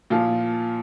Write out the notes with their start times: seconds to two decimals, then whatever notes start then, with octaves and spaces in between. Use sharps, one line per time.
0.10 A#2 F3 F4